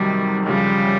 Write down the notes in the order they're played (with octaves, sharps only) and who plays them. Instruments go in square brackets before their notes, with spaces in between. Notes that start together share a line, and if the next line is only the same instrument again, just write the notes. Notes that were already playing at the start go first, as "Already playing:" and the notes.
Already playing: [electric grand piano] F2 C3 D#3 F#3 [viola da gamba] G3
[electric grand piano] F#2 C#3 F3 [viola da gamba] G3